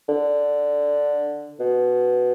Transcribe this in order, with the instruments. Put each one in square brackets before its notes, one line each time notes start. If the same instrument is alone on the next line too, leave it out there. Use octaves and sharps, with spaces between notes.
[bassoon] D3
B2